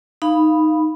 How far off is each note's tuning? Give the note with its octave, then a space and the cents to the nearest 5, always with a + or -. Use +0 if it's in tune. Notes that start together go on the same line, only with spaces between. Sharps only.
D#4 +0 F5 -10 B5 +0